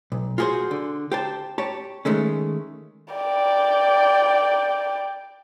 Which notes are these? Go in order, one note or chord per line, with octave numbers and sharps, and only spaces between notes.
B1
F4 F#4 G#4 A#4 C5
D3
G4 C5 A5
G4 C#5 A5
D#3 G#3 A3 C#4
D5 G5